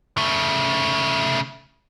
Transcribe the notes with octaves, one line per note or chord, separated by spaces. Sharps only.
C#3 A3